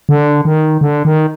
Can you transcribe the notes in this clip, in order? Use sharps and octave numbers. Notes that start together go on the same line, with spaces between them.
D3
D#3
D3
D#3